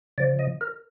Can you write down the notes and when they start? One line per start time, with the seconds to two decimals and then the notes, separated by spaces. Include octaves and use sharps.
0.18 C#3 F3 D5
0.39 D#5
0.61 A#4